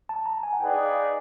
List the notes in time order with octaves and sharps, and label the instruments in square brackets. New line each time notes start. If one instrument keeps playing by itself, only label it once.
[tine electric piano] A5
A#5
G#5
F#5
[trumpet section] D#4 G#4 B4 D5 [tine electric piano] G5
[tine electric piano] F5